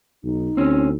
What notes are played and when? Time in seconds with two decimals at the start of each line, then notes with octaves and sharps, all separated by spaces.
0.24 B1 D#4
0.57 D2 C4 C#4